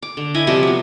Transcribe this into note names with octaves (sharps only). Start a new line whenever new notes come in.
D6
D3
E4 D#5 G#5 B5
C3 F3 G3 D#5
F#3 B3